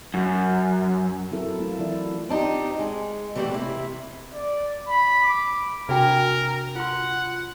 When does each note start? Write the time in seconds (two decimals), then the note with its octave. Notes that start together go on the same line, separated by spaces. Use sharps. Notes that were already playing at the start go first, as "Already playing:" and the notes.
0.14 F#2
1.31 F#3 C4 E4 A4 A#4
1.59 A3 C4 F4
1.79 E3 E4 D5
2.29 C4 D4 D#4 G4
2.79 G#3
3.36 E3 G3 A3 D4 F#4 G4
3.51 C3 E4
4.34 D5
4.89 B5
5.24 D6
5.89 C3 D4 F#4 A#4 G5
6.76 F4 F#5 C6